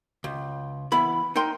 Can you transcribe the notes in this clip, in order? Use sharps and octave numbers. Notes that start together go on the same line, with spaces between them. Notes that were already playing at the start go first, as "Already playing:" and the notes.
C#2
E3 B3 E4 B5
D#4 A#4 G5 C6